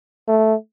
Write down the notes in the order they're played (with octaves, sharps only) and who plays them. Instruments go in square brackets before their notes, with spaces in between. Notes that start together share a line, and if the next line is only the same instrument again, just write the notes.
[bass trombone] A3